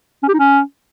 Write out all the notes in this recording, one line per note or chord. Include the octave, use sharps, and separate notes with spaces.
C#4
G4
D#4
C#4